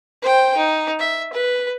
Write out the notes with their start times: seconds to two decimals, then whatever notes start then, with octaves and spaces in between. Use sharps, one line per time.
0.22 C5 G5
0.57 D#4
1.00 E5
1.33 B4